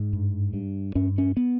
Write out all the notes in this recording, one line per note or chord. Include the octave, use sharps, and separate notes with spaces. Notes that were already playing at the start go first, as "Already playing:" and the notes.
Already playing: G#2
G2
G2
G2 C#4
C#4
B3